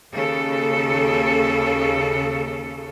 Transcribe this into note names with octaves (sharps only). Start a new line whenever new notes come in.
D#2 C#3 A4